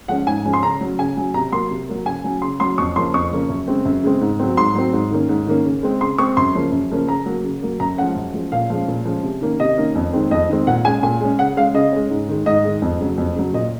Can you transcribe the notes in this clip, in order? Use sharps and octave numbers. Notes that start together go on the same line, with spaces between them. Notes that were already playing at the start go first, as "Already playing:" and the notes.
F3 G#3 C#4 F#5
G#2 G#5
F3 G#3 C#4
C6
C#3 A#5
F#3 C#4
C#3 G#5
F#3 C#4
C3 A#5
F#3 A#3 C6
C3
F#3 A#3
C#3 G#5
F#3 C#4
C#3 C6
F#3 C#4 C6
F2 C#6
C#3 F3 A#3 C#4 C6
F2 C#6
C#3 F3 A#3 C#4
F#2
C#3 G#3 C4
F#2
C#3 G#3 C4
G#2
F#3 C4
G#2 C6
F#3 C4
G#2
D#3 A#3 C#4
G#2
D#3 A#3 C#4
C#3
G#3 C4
C#3 C6
G#3 C4 C#6
F#2 C6
C#3 F3 A#3 C#4
F#2
C#3 F3 A#3 C#4
C#3 A#5
F#3 A#3
C#3
F#3 A#3
F#2 A#5
F3 G#3 C#4 F#5
F#2
F3 G#3 C#4
A#2 F5
F3 G#3 C#4
A#2
F3 G#3 C#4
C3
D#3 A#3 C#4
C3 D#5
D#3 A#3 C#4
F2
D#3 G#3 C4
F2 D#5
D#3 G#3 C4
A#2 F#5
G#3 C#4 G#5
A#2 G#5
G#3 C#4
C#3 F#5
G#3 C#4 F5
C#3 D#5
G#3 C#4
G#2
D#3 G#3
G#2 D#5
D#3 G#3
F2
C#3 F#3
F2
C#3 F#3
A#2 D#5